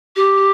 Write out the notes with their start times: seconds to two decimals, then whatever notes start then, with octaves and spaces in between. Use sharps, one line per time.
0.16 G4